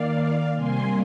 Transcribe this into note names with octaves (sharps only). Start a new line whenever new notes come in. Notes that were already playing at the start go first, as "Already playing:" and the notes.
Already playing: D#3 A#3 D5 F5
C3 G3 A#3 G#5 C6